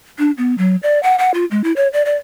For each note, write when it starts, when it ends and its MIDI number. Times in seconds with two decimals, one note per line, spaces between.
0.19 0.31 62
0.38 0.55 59
0.58 0.76 54
0.83 1.01 74
1.03 1.16 78
1.18 1.31 78
1.34 1.45 65
1.51 1.62 56
1.64 1.73 64
1.76 1.88 73
1.93 2.05 74
2.05 2.15 74